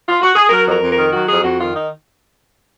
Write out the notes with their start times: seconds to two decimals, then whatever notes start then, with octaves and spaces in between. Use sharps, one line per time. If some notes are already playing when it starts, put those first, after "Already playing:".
0.09 F4
0.22 F#4
0.36 G#4
0.50 F#3 A#4
0.66 F2
0.71 A#4
0.82 F2
0.93 D#3 A#4
1.13 F#3 F#4
1.29 F2 G#4
1.44 F2 F#4
1.61 D#3 F4
1.76 D#4